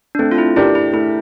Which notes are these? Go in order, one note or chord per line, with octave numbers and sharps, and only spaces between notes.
D4
A3 C4
F4
E4
D4 E4 G4 A#4
E4
A3 E4